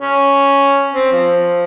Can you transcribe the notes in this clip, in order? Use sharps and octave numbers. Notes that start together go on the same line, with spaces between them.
C#4
C4
F3